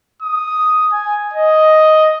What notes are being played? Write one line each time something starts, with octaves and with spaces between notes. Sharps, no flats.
D#6
G#5
D#5